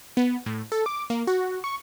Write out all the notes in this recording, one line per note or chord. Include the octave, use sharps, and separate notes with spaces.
B3
A2
A4
D6
A#3
F#4
C#6